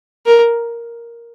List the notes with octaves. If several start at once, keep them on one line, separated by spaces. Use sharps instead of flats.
A#4